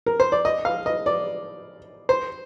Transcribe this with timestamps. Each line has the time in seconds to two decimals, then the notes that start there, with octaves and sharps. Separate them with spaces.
0.06 A#4
0.20 C5
0.32 D5
0.45 D#5
0.65 F5
0.86 D#5
1.06 D5
2.09 C5